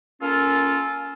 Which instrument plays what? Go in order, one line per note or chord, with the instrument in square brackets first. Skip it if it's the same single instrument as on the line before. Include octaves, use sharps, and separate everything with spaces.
[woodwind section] A#3 C#4 F4 A4